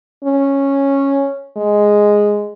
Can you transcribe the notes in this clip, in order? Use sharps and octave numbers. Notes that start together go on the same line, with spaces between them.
C#4
G#3